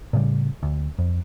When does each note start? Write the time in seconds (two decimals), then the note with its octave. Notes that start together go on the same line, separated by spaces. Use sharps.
0.13 A2 C#3 G3
0.63 D2
0.98 F2